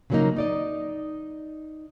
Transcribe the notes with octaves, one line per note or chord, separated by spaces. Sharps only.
C#3 F3 F#3 A3 A#3 D#4
D#4 D5 D#5